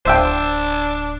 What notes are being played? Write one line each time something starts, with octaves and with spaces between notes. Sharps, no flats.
D1 D4 C5 E5 G5